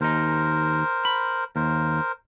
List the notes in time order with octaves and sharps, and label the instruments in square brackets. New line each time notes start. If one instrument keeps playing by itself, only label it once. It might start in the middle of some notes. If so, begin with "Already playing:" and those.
[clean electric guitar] D#2 D#4 [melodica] A#4 C5
[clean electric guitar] B5
[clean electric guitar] D#2 [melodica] A#4 C5